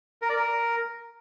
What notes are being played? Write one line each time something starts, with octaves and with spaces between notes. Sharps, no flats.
A#4
D5
A#4